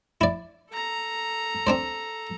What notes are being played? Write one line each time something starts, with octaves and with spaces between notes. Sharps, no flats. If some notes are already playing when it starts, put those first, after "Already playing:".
E4 D5
A4 A#5
C4 D4 C5